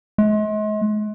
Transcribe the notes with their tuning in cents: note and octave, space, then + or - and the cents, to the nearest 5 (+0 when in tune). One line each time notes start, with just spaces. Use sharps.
G#3 +40